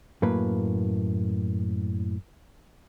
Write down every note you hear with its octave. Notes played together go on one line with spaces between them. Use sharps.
F#2 A2 A#3 B4